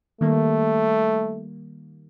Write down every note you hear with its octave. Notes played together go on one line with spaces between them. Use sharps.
D#3 G3 A3 A#3